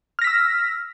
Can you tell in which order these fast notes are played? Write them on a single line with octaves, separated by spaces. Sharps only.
F6 A#6 B6 E6